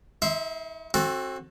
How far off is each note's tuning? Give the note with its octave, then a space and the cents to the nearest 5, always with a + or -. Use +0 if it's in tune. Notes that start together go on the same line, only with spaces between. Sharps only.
D#4 +45 E5 +0 C6 +0
C4 +30 F#4 +0 A4 +0